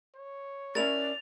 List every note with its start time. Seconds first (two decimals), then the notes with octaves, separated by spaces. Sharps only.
0.15 C#5
0.75 C#4 E4 A#4 D5 A6 F7